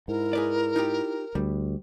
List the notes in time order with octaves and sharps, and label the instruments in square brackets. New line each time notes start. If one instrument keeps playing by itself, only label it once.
[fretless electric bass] G#2 [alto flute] E4 [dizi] A#4
[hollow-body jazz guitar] G#4 B4 D5
D#4 F4 G4
[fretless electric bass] D2 [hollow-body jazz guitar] G3